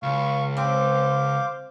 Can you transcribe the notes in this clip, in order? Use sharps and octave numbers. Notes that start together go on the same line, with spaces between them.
C#2 F5 C#6
C4 C5 F5 D6